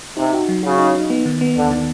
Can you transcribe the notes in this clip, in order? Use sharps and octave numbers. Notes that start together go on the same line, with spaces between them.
C3 D#4
F#4
F#3
C#3 F#4
D#4
D#4
B3
D#3
B3
D#2 D3
D#3